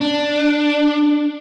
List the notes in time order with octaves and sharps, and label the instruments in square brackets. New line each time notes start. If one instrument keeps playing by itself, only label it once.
[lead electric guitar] D4